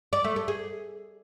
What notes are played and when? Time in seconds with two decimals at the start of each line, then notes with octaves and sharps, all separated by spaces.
0.13 D5
0.24 A3
0.36 A4
0.48 G#4